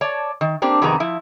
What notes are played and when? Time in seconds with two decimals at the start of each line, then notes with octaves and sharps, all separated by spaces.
0.01 C#5 D5 A5
0.41 D#3
0.62 A#3 C4 D4 G4
0.82 F2 C3 D#3 B3 G#4 A#5
1.00 F3 E4